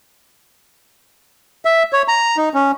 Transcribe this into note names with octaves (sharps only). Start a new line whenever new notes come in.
E5
C#5
A#5
D#4
C#4